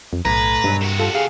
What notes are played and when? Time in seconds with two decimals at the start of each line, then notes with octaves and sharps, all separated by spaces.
0.13 F2
0.25 B1 A2 B4 A#5
0.64 G2 B2 F#3 C#4
0.81 C3 A#3 F#4
0.99 G3 F4 A4
1.14 G#4 F5